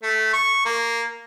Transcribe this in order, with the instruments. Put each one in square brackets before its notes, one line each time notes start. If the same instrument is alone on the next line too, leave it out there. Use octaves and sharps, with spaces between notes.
[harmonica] A3
C#6
A#3